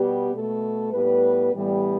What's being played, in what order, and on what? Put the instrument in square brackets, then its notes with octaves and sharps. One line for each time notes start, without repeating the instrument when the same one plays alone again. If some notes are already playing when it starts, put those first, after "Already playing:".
Already playing: [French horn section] B2 G3 B3 G4
B2 A3 A4
A2 G3 B3 B4
A2 E3 G3 B3